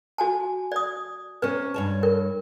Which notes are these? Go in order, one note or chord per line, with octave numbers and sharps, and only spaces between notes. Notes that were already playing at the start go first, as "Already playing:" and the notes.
F#4 G#5 A5
D5 D#6
C3 C#4 B4
G2 C#5 A5
A#4